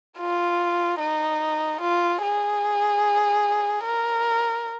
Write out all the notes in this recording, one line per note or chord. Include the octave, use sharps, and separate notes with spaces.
F4
D#4
F4
G#4
A#4